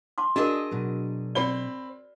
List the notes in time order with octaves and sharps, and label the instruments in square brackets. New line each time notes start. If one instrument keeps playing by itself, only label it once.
[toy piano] A5 C6 D6
[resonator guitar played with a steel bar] D4 G#4 D#5 [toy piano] F#4 A#4 [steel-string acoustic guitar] E5
[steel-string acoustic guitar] B2 F#3
[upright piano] C4 B5 G7 [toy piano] D5